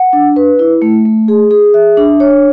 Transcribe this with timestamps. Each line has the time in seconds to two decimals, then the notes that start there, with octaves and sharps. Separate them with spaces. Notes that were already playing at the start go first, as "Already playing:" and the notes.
Already playing: F#5
0.13 D4
0.36 B4
0.59 E4
0.82 A3
1.05 A3
1.28 G#4
1.51 G#4
1.74 E5
1.97 D4
2.20 C#5